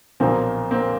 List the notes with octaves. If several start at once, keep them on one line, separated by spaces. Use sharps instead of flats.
B1 A#2 F3 A#3 C4
A#3 C4